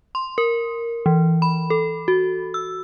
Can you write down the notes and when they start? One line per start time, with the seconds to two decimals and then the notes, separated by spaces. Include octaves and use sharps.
0.15 C6
0.38 A#4
1.06 E3
1.42 B5
1.70 A4
2.08 F#4
2.54 E6